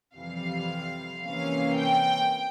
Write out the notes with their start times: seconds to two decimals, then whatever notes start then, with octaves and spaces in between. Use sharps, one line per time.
0.15 F2 C3 E3 G3 F5
1.24 C3 E3 A#3 C#4 F5
1.79 G5